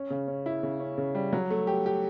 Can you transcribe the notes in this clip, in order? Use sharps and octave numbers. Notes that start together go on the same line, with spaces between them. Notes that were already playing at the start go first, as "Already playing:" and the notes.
Already playing: C#4
C#3
C#4
E4
C#3
C#4
C#3
G3
F#3
A3
G4
G4